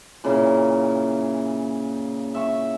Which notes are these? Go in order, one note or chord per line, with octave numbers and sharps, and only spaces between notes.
A#2 C#3 E3
E5 C#6